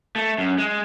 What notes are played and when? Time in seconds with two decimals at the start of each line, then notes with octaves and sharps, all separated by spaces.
0.16 A3
0.38 F#2
0.58 G#3